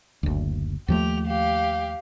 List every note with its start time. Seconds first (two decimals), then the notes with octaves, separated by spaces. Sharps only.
0.23 F#1 D2
0.88 D#2 F3 A3 G4 F7
1.27 G4 F5